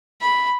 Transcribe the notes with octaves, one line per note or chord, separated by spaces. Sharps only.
B5